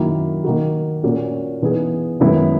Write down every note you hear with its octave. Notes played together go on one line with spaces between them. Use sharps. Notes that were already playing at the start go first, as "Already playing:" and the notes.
Already playing: F#2 D#3 F#3 A#3 E4
D#3 A#3 D#4 F#4
A#2 A#3 C#4 F#4
E3 B3 D#4 G#4
F#2 D#3 G#3 B3 E4